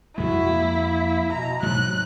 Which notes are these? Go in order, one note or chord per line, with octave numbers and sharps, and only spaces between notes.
F2 G#3 E4 F#4
A#3
B2 A#5
D2 G#2 F#3 F#6